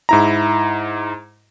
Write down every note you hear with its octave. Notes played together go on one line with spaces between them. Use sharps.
G#2 E4 A#5